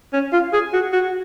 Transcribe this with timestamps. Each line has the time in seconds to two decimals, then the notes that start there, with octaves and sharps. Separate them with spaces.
0.13 C#4
0.33 F4
0.53 G#4
0.73 F#4
0.93 F#4